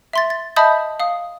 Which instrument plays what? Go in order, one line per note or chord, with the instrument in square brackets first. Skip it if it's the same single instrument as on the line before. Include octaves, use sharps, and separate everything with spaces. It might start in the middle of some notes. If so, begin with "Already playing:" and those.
[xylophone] E5 C6 A6
A6
D#5 E5 A5 B5 D#6 G6
F5 D#6